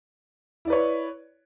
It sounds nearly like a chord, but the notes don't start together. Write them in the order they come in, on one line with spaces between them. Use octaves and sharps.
E4 D5 B4 C#5